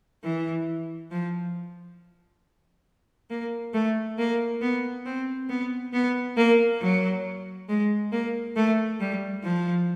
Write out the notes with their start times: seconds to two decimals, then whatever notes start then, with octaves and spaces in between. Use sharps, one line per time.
0.23 E3
1.11 F3
3.30 A#3
3.74 A3
4.18 A#3
4.61 B3
5.05 C4
5.49 B3
5.93 B3
6.37 A#3
6.81 F#3
7.69 G#3
8.12 A#3
8.56 A3
9.00 G3
9.44 F3